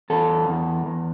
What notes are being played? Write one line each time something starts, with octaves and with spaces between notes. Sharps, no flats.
E2 A4
E2
E2